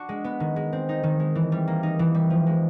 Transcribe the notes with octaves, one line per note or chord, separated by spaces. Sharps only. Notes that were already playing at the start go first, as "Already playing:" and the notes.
Already playing: D4 F#4
G#3
B3
D#3
G#3
C4
D#4
D#3
G#3
E3
G3
A#3
D#4
E3
G3
F3
G#3